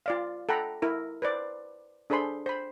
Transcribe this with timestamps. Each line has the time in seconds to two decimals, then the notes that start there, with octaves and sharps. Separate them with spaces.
0.06 F4 D5 F5
0.49 A4 F#5 G5 A#5 B5
0.82 E4 A#4
1.22 B4 C5 D5
2.10 D4 G#4 A4 C5 B5 C6
2.46 C5 B5